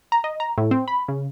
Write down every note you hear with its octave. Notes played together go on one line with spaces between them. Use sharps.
A#5
D#5
A#5
A2
C4
B5
C#3